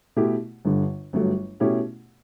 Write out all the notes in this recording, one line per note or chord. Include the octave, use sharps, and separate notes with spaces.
B2 A3 E4 G4
G1 G2 D3
G1 G2 F#3 A3
B2 A3 C#4 E4 G4